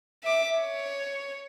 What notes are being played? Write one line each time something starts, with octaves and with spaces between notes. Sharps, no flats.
E5 D6
C#5